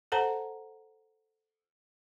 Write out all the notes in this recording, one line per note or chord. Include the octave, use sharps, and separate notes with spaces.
A4 C5 F#5 A5 A#5